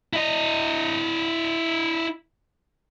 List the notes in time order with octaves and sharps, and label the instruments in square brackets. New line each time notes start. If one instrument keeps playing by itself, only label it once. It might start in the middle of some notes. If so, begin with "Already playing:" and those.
[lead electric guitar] E4 D#5